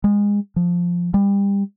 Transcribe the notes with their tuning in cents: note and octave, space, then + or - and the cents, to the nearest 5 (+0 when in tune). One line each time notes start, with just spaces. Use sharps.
G#3 -25
F3 +0
G3 +30